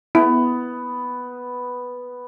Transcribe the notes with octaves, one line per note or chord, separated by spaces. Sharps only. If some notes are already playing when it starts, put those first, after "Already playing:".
B3 E4